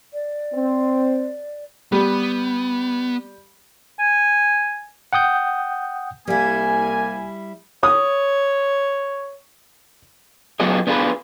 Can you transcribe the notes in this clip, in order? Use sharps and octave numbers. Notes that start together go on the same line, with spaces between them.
D5
C4
G3 B3
G#5
F#5 G5 D#6 G6
C2 G3 A#3 E4 G#5
C#5 D#6
F#3 B3 F4 G4 G#4 D#5
B3 D4 F4 G#4 A4 B4